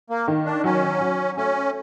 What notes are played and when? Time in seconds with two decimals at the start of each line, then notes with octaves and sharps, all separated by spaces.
0.10 A#3
0.28 D#3
0.45 D4
0.64 F#3 C#4
1.01 F#3
1.37 A3 C#4